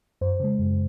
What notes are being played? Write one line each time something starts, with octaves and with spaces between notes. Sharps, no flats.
F#2 C5
C#3 G#3
F#2